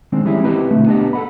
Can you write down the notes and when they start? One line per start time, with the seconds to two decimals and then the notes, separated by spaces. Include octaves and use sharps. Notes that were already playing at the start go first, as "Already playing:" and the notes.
0.12 D#3 G#3 C4 D4
0.24 E3 G3 G#3 C#4 E4
0.43 C4 E4 G4 B4 D#5
0.71 B1 A#2 D3 A3
0.86 B3 D4 G4 D#5
1.13 A4 F#5 B5